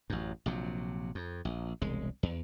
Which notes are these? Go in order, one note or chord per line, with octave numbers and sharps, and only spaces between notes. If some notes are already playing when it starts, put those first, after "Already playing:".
A1 F#2
A#1 C3 F#3
F2
A#1
E1 C2 G#3
E2